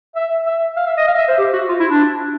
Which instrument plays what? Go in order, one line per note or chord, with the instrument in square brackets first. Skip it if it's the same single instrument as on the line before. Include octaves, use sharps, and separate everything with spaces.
[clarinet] E5
E5
F5
E5
D#5
F5
E5
C5
G4
F#4
F4
E4
D4